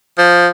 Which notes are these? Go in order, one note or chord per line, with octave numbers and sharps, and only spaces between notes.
F3